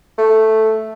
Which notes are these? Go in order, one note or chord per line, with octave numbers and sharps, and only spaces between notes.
A3